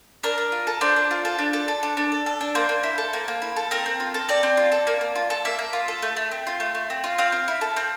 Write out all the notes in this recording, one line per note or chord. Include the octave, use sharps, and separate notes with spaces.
D4 A#4
D4
F4
A4
D4 C5
D4
F4
A4
D4
A4
A4
D4
D4
A4
A4
D4
A#3 C5
A#3
E4
A4
A#3
A#3
E4
A4
C4 A#4
C4
F4
A4
C4 D5
C4
F4
A4
A#3
A#3
F4
A4
A#3 E5
A#3
F4
A4
A3
A3
C4
F4
A3
A3
C4
F4
C4 F5
C4
E4
A4
C4